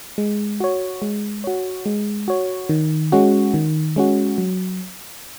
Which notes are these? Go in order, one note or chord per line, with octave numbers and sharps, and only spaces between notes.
G#3
F#4 C#5
G#3
F#4 C#5
G#3
F#4 C#5
D#3
G#3 C#4 F#4
D#3
G#3 C#4 F#4
F#3